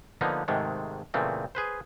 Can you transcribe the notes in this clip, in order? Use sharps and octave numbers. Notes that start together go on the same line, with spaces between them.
D3 F3 A#3 B3 D#4
G#2 C3 D#3 G#3 A3
A#2 C#3 E3 A3 C4
G#4 B4 C5